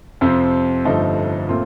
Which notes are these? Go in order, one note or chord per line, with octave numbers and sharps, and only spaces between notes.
F2 C3 F3 C4
G1 G2 F3 A3 D#4
A#2 A3 C4 F4